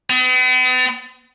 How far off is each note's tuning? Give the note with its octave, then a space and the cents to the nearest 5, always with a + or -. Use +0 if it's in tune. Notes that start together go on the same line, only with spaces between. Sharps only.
B3 +45